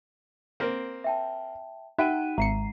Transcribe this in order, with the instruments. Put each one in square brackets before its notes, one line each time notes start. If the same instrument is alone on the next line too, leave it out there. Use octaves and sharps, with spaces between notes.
[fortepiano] A#3 C4
[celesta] E5 G5 A5
[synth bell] D#4 F#5 D#7 [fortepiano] E5 [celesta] G5 F#6
[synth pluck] G#1 C#7 [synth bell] G#3 C7 [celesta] A#5